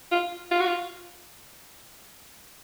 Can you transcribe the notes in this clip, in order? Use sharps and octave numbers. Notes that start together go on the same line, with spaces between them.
F4
F4
F#4
F4